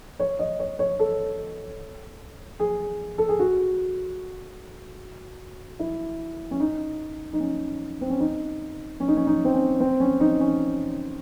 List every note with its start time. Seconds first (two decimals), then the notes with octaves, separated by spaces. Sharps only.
0.19 C#5
0.39 D#5
0.59 C#5
0.79 C#5
0.99 A4
2.60 G#4
3.18 A4
3.29 G#4
3.39 F#4
5.80 E4
6.51 C#4
6.60 D#4
7.33 D#4
7.40 C#4
8.01 C4
8.10 C#4
8.20 D#4
9.00 C#4
9.08 D#4
9.17 C#4
9.27 D#4
9.45 C4
9.53 C#4
9.80 C4
10.00 C#4
10.20 D#4
10.40 C#4